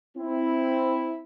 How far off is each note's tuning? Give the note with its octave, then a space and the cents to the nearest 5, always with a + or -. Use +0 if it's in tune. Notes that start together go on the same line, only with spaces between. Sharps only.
C4 +0 E4 +0